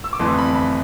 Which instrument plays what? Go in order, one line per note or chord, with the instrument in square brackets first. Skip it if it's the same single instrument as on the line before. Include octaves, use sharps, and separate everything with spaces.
[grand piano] E6
D6
G1 F2 E3 A3 C6
B5
B5